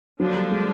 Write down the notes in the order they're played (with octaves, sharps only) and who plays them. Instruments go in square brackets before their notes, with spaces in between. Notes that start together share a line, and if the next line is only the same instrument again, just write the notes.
[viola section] D3 F3 A#3 D4 F4 [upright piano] F#3
[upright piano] G3
G#3